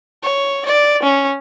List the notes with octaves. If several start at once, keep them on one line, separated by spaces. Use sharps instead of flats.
C#5
D5
C#4